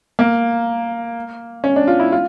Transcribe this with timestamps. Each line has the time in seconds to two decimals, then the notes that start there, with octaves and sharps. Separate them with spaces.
0.19 A#3
1.64 C#4
1.76 D4
1.88 F4
2.00 E4
2.12 F4